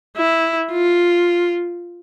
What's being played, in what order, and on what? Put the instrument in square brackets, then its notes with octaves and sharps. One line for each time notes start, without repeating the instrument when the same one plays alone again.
[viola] E4
F4